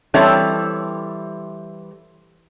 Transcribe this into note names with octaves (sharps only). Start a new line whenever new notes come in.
E3 G3 C4 A4 C#5 E5